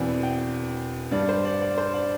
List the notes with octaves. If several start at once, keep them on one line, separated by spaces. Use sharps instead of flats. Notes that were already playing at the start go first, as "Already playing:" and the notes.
Already playing: E1 E2 E3 C4 D5
G5
G2 G3 D4 D5
C5
D5
D5
C5
D5